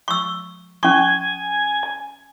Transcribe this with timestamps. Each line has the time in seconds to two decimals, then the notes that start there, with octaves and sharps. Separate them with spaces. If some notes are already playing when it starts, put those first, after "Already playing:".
0.08 C#6 E6
0.83 C#4 G#5 C#6